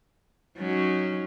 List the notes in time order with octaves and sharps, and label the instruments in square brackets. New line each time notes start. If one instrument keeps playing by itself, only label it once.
[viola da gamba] F#3 C#4 D#4